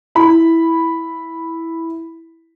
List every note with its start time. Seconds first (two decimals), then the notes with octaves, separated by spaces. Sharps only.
0.15 E4 B5